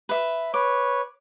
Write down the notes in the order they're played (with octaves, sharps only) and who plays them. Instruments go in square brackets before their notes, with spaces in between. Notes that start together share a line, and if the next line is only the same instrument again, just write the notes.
[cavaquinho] B4 E5
[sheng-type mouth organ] B4 C#5 [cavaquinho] D6